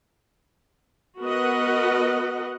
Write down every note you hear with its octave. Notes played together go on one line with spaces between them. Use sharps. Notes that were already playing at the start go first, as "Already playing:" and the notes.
B3 F#4 A#4 B4 D#5 F#5